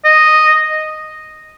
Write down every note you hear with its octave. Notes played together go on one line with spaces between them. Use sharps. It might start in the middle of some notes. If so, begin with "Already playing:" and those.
D#5